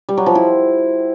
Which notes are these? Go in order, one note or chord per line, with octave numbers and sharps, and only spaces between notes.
G3
F#3
F3
E4